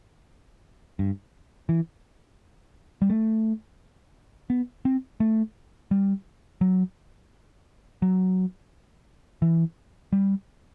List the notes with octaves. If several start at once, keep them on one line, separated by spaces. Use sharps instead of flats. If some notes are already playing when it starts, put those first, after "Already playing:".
G2
E3
G3
A3
B3
C4
A3
G3
F#3
F#3
E3
G3